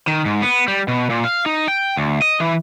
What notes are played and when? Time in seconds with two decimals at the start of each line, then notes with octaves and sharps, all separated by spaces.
0.07 D#3
0.25 G#2
0.42 B3
0.68 G3
0.88 B2
1.10 A#2
1.25 F5
1.46 D#4
1.68 G5
1.97 D2
2.22 D#5
2.40 E3